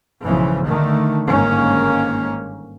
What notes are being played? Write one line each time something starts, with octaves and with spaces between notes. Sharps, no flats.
B1 G#2 C#3 E3 F3
D3 D#3 A3
G1 G#2 D#3 A#3 C#4